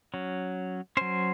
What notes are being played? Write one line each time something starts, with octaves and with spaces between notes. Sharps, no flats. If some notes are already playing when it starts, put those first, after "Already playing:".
F#3 C#4
F#3 C#4 C5